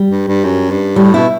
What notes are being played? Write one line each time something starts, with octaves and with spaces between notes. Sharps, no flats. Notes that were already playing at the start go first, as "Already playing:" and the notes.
Already playing: G3
G2
G2
F#2
G2
A2 G3
B2 E4